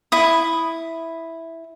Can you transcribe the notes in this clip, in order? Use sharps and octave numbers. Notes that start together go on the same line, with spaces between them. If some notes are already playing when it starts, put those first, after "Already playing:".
E4 D#6